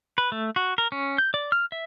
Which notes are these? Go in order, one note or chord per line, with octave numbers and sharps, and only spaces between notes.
B4
A3
F#4
A#4
C#4
G6
D5
F6
E5